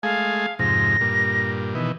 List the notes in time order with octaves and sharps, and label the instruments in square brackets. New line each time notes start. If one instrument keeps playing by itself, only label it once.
[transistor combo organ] G#3 A3 G#4 [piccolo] F5
[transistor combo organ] F2 G#2 C3 [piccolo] A#6
[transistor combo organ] G2 A#2
B2 D#3 E3